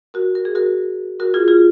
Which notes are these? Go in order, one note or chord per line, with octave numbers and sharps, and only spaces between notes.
F#4 A#4
A#4
G#4
F#4 A#4
F#4 A#4
F4 G#4
F4 G#4